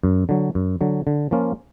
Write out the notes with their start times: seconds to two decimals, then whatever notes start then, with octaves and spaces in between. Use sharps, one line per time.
0.04 F#2
0.29 D3 F#3
0.55 F#2
0.81 D3 F#3
1.07 D3
1.31 F3 A#3 C#4 F4